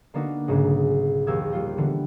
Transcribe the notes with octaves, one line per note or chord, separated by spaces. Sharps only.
D3 A#3 B3 D4 D#4 F#4
B1 G#2 C#3 G#3
A#1 D#2 G4 E6 G#6
G3 F4
D3 E3 B3